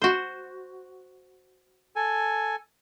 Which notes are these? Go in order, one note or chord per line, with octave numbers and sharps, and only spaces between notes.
F#4 C5
A4 G#5